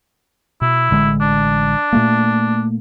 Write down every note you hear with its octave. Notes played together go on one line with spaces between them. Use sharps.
B2 E4
A1 D3 G#3
D4
A#2 A3 A#3